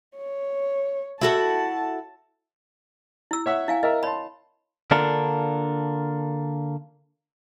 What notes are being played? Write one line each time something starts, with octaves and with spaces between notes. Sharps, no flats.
C#5
E4 F#4 A4 A5
E4 E6
C#5 E5 F#5
E4 F5 G#5
A#4 D#5 E5
C#5 A5 B5 C6
D3 A#3 D4 F4 A4 A#4